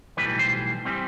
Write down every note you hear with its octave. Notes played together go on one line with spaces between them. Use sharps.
B1 A2 E3 G3 B4
C5
E3 G3 C4